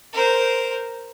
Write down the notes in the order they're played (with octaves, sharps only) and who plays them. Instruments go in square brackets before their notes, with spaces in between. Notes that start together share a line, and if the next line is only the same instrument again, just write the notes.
[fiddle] A#4 C5